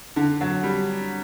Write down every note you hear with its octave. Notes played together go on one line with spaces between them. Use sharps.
D3
F#3
G3